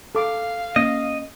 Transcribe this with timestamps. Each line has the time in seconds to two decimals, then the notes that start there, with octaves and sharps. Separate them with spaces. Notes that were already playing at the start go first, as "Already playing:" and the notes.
0.15 A4 F5 D6
0.76 A#3 C#4 D#5